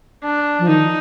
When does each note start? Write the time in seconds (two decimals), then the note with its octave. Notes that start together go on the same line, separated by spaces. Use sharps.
0.23 D4
0.59 F3
0.68 D#3 D#4